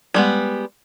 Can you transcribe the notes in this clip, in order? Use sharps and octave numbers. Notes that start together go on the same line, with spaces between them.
G3 G#3 B3